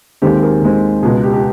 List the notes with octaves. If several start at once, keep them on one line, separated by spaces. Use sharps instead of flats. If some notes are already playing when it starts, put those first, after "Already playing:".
D#2 D#3 G#3 C4 G4 A4
G#4 A#4
D#2 D#3 G#3 C4
C#2 B2 G#3 G#4
G4
G4